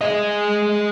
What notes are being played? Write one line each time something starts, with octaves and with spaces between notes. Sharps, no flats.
G#4 D#5